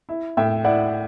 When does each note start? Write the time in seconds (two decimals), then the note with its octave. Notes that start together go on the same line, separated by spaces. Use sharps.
0.09 E4
0.37 A2 E5 G5
0.64 E4 D5 F#5